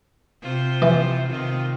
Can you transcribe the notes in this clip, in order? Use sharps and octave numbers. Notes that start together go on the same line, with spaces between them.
C3 F4 C5
E3
C3 D#3 F4